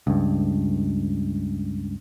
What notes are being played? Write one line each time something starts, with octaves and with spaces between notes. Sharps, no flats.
C#2 G2